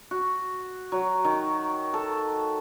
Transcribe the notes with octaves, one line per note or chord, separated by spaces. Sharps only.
F#4
F#3
D#3
A4